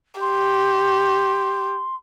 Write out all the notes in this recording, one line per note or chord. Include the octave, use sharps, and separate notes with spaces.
G4 C6